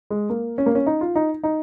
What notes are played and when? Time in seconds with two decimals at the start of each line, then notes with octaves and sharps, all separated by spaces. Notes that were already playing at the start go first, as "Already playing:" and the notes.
0.11 G#3
0.30 A#3
0.58 C#4
0.66 A#3
0.75 C#4
0.87 D#4
1.01 F4
1.16 D#4
1.44 D#4